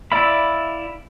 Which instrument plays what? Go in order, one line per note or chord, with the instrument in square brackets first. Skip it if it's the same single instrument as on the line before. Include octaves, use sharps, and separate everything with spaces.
[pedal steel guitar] E4 D5 E5 F5 B5